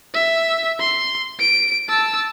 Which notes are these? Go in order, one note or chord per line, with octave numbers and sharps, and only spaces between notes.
E5
C6
D7
A5 E6